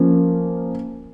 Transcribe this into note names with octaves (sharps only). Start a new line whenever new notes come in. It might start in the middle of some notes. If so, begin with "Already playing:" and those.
Already playing: F3 A#3 C#4